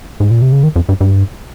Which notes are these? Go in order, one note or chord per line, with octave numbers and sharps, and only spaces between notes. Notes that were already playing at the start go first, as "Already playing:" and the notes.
G#2
A#2
C3
C#3
D#3
F2
G2
G2